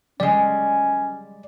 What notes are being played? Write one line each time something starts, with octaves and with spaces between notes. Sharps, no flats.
G3 G#3 C#4 D5